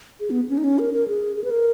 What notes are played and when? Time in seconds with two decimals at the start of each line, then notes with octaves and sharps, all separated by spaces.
0.20 G#4
0.30 B3
0.50 C#4
0.58 D#4
0.64 C#4
0.79 A#4
0.93 A#4
1.08 G#4
1.36 G#4
1.44 B4
1.50 A#4